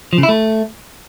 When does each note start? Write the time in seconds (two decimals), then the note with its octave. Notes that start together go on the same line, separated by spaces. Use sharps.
0.13 F3
0.18 C#3
0.23 E4
0.29 A3